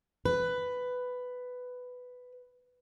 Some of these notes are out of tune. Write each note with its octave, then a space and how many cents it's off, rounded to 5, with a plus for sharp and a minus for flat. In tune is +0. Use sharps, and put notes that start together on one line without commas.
B4 +10